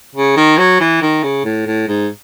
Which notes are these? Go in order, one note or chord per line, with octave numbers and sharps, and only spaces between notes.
C#3
D#3
F#3
E3
D#3
C#3
A2
A2
G#2